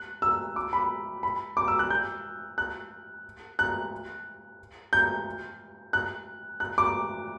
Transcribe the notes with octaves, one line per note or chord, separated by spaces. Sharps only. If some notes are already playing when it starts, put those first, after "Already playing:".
Already playing: F#6
E6
D6
B5
B5
D6
E6
F#6
G6
F#6
F#6
G6
F#6
F#6
D6